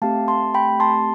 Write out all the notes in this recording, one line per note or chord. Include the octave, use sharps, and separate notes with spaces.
A3 C4 G4 F5 A5
A5 C6
G5 B5
A5 C6